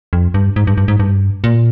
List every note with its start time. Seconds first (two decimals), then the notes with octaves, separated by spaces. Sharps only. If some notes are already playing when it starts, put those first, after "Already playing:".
0.13 F2
0.34 G2
0.56 G#2
0.67 G2
0.78 G2
0.88 G#2
1.00 G2
1.44 A#2